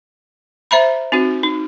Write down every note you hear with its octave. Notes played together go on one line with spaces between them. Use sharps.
C5 E5 A#5 B5
C4 D#4 F#4
D#4